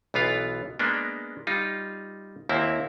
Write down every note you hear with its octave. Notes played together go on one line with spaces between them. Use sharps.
B1 E3 B3 F4 F5
G#3 A#3 B3 D4
G3 D#4 F4
D#2 A#3 C4 E4 E5